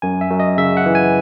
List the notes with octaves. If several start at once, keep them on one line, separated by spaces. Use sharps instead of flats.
F#2 G#5
E5
F#2
D#5
C#3 E5
F#5
E3
G#5